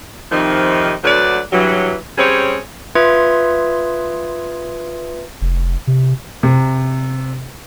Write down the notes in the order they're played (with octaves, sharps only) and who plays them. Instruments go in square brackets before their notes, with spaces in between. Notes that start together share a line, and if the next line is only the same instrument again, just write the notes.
[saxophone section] F2 C3 D#3 F3 D#4
D2 D3 F#3 B4 D5
G2 E3 F#3
G3 C4 C#4 G#4 C#5
[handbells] F4 B4 E5 C6 D#6 G#6
[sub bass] F1
C3
[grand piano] C3